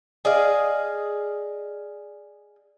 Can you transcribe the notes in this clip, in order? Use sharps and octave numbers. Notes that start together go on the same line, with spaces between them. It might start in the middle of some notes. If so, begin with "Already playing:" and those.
G#4 D5 D#5 F5